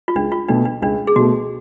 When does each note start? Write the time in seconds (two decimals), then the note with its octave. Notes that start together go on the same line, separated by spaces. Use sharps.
0.08 F4
0.15 C#2 D4
0.32 F4
0.48 B2 A3 D4
0.65 D4
0.82 C#2 D4
1.07 G#4
1.16 B2 A3 F#4